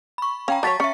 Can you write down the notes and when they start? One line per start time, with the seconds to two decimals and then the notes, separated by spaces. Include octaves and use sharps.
0.18 B5 C#6
0.48 C#4 F5 G5 A#5
0.63 F#3 F#4 C#5 A5 A6 B6
0.80 C#4 E5 C#6 C#7